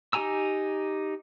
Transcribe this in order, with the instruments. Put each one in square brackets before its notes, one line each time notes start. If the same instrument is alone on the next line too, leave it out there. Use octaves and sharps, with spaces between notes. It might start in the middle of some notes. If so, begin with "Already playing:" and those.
[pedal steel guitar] D#4 G4 G#5 A#5 E6